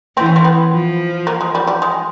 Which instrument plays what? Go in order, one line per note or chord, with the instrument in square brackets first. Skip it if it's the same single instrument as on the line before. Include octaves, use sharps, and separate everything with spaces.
[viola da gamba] E3 [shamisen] C4
[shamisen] C#4
C4
B3
[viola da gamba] F3
[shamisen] A#3
G#3
G3
G3
G#3